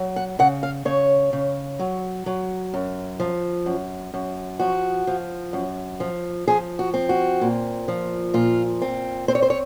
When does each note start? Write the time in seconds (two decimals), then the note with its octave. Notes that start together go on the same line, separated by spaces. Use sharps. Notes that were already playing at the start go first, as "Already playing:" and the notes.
Already playing: F#3
0.16 F#5
0.39 C#3 F#5
0.63 F5
0.85 C#3 C#5
1.33 C#3
1.79 F#3
2.26 F#3
2.74 F#2
3.20 F3
3.66 F#2
4.14 F#2
4.60 F3 F#4
5.07 F3
5.53 F#2
6.00 F3
6.48 F3 G#4
6.79 F#4
6.94 C4
7.09 F#4
7.41 A#2
7.88 F3
8.34 A#2 F4
8.82 C4
9.28 C4 C5
9.35 C#5
9.42 C5
9.50 C#5